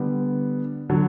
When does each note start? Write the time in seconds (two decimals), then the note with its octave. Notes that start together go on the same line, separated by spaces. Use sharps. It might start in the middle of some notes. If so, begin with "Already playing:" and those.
Already playing: D3 G3 B3
0.89 D3 F#3